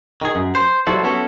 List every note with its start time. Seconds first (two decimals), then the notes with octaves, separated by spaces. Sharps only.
0.22 D#3 G#4
0.35 F#2
0.55 C5
0.87 F#3 G3 E4 F#4 A4 C5
1.04 B3 C#4 E4 F#4 A4